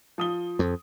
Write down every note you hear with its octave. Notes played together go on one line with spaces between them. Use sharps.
F3 D#6 G7
F2